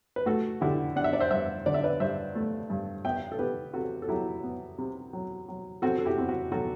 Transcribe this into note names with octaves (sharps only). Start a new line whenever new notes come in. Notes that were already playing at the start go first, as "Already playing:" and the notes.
B4
A3 F#4 A4
D3 E4 G4
D4 F#5
E5
D5
C5 E5
G2 C5 E5
D3 D5
E5
B4 D5
G2 C5 E5
A3
G2
B3 E5 G5
A4
B3 G4 B4
C3 F#4 A4
A4
F#3 E4 G4
B3
C3
F#3
F#3
C4 F#4 A4
A4
E4 G4
C4
F#4
F#3 F#4 A4